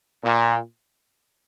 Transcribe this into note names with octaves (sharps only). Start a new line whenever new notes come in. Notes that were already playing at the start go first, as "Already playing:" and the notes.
A#2